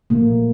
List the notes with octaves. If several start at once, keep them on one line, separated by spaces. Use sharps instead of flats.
A#2 F3 A3 A#3